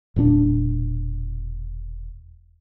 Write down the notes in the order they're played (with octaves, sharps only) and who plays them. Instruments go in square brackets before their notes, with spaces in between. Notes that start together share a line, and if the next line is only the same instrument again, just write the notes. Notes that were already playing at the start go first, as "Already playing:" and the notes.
[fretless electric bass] E1 A#2 C4 D4